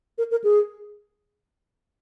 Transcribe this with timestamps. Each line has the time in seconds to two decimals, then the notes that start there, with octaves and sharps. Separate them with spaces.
0.18 A#4
0.31 A#4
0.44 G#4